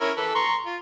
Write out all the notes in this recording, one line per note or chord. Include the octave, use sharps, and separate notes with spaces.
C#4 E4 A#4
E3 A4 B4
A#5 C6 C#6
F4